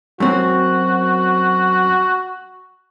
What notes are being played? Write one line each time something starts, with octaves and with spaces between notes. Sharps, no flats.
F#2 C4 F#4